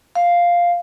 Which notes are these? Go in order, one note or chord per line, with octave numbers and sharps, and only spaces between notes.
F5